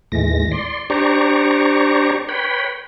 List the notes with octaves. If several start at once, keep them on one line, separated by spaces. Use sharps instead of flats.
D#2 A2 E3 G#3 A#6
D5 C6
D4 G4 C5 D5 A#5 C#6
B4 C#5 G5 B5